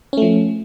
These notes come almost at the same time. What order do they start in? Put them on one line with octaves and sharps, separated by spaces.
C#4 A3 F3